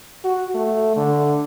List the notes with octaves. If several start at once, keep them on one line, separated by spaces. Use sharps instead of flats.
F#4
A3
D3